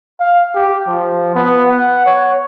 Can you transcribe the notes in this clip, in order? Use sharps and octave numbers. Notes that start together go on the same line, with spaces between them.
F5
G4
F3
B3
F#5
C#5